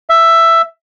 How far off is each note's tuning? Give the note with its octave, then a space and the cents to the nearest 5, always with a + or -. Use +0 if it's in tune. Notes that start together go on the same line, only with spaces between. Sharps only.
E5 +10